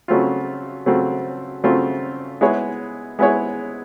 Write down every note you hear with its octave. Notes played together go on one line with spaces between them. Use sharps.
C#3 F#3 A3 C4 F4
C#3 F#3 A3 C4 F4
C#3 F#3 A3 C4 F4
G#3 B3 E4 G#4 C#5
G#3 B3 E4 G#4 C#5